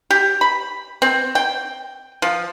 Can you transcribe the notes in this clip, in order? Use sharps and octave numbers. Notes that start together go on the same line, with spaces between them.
G4
B5
C4
G5
F3